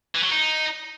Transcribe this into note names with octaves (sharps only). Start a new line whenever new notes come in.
E3
F#3
D#4